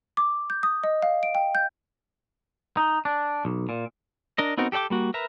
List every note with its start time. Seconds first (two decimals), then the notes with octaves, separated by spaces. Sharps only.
0.17 D6
0.50 G6
0.63 D#6
0.84 D#5
1.02 F5
1.23 D7
1.35 G5
1.55 G6
2.77 D#4
3.05 D4
3.45 B1
3.69 A#2
4.38 D4 A#4 D#5
4.58 B3 C4 D#4 F#4 A#4
4.72 G4 A4 D5 G5 D6
4.90 G3 A#3 F#4
5.14 A#4 B4 E5 A#5